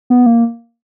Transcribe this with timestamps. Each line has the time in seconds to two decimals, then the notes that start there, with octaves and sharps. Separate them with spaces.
0.10 B3
0.26 A#3